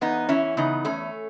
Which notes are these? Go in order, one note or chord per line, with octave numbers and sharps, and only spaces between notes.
E2 B3 D#4
E3 C#4 E4
C#3 B3 D#4
E2 A3 C#4